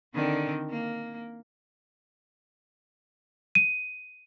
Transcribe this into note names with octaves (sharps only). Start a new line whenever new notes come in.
D3 D#3 C4
A#3
D#7